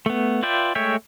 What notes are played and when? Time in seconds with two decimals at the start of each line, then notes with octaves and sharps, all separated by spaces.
0.06 A3 B3
0.43 F4 B4 D5 E5 G5
0.75 G#3 A3 C#5 E5 G5